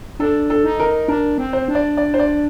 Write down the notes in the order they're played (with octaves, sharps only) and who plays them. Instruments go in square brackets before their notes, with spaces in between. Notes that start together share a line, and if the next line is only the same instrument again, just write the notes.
[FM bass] D4 [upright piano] A4
[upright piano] A4
[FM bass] D#4
[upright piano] A#4
[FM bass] D4 [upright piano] A#4
[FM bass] C4
[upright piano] C5
[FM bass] D4
[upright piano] D5
D5
C5
D5